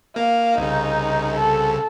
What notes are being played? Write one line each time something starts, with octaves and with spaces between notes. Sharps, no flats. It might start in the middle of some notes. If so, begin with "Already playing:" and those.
A#3 F5
C2 C#3 D#4
A4